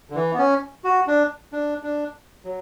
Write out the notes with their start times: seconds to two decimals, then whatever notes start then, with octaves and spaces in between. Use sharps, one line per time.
0.10 D3
0.15 E3
0.34 B3
0.38 C#4
0.84 F#4
1.07 D4
1.53 D4
1.83 D4
2.45 F#3